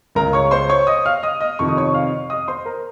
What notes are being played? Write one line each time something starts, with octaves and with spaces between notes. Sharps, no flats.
C#2 C#3 A#4 A#5
C#5 C#6
C5 C6
C#5 C#6
D#5 D#6
F5 F6
D#5 D#6
D#5 D#6
F2 C3 D#3 C#6
D#6
C#5 C#6
F5 F6
D#5 D#6
C5 C6
A#4 A#5